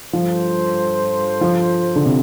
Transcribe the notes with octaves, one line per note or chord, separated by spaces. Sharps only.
G2 F3 G3 F4 A4 C5
F3
D3
C3